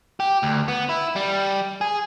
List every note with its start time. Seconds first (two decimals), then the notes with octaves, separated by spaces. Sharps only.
0.20 G4
0.43 D2
0.68 B3
0.89 E4
1.16 G3
1.81 G#4